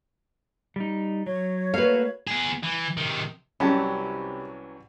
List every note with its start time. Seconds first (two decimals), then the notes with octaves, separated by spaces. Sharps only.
0.76 G3 D#4
1.26 F#3 C#5
1.74 A3 A#3 F#4 B4 F5
2.27 B3 G#4
2.63 E3
2.97 C3 D#3
3.60 C2 C3 E3 F#3 C#4 G4 A5 B5